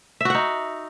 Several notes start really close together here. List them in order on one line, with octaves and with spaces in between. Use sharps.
E5 F#4 F#5 D#4